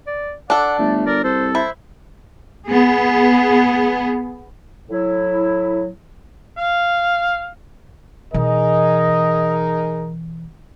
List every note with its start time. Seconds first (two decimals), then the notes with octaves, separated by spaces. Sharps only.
0.07 D5
0.50 D4 A4 D5 F#5
0.79 G1 A3
1.07 A#4 D5
1.24 C2 A4 C5
1.55 E4 C5
2.67 B3 G#4
4.90 A2 F#3 E4
6.57 F5
8.34 B2 E3 D#4 G#4 A#4 D#5